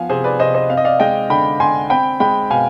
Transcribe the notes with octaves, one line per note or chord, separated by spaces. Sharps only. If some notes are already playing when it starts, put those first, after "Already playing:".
Already playing: F3 B3 F5 G#5
C3 G#4 C5
B4 D5
C3 C5 D#5
C5 D#5
C4 F5
D#5
D5 F5
G#3 D#5 G5
D3 G5 B5
D3 G#5 C6
C4 G5 B5
G#3 G5 B5
B2 F5 G#5